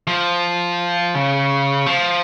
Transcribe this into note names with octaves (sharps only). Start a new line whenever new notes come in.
F3
C#3
F3